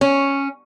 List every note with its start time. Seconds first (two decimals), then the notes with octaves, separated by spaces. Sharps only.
0.01 C#4